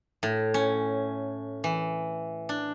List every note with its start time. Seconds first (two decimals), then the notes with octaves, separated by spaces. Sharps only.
0.23 A2
0.54 C#4
1.64 E3
2.49 D4